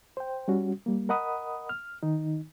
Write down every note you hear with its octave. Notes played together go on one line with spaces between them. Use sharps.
C5 G5
G3 C#4 F#4
G3 A#3
A#4 D#5 F#5 B5 D#6
F6
D#3 D#4